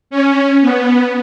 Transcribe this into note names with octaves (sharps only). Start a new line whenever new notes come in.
C#4
B3